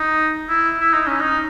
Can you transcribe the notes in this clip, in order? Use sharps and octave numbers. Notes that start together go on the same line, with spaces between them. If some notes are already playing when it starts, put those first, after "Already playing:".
Already playing: D#4
E4
E4
D#4
C#4
D#4